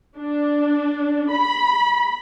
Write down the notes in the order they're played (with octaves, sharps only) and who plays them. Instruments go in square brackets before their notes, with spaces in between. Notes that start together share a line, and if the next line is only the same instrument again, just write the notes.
[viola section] D4
B5